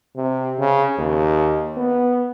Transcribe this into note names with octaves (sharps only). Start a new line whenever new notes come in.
C3
C#3
D#2
B3